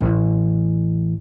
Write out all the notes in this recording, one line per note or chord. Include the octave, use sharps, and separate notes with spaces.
A1 E2